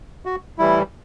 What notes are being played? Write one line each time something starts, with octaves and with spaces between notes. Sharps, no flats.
F#4
A2 E3 G3 E4